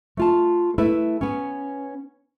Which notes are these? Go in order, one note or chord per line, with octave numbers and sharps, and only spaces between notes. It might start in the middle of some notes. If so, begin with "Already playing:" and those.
A3 F4 A5
A3 E4 B4
B3 C#4